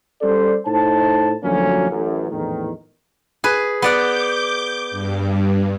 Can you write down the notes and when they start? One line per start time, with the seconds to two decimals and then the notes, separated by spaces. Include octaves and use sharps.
0.22 G3 C#4 A4 C5 D5
0.67 A2 D#4 C5 A5
1.43 D2 F3 F#3 A#3 C#4
1.90 A1 F#2
2.31 A#1 E2 A2 D#3
3.44 G#4 B4
3.82 B3 D5 F#5 D6 G6
4.91 G2